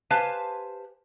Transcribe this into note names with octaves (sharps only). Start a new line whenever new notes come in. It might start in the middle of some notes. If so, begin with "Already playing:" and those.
G4 B4 C5 F5 G#5 A5